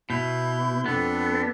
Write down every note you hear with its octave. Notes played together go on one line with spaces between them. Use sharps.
B2 E4 G6
F2 B3 D4 A4